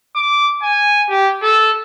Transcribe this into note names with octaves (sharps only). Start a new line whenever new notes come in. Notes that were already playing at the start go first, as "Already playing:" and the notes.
D6
G#5
G4
A4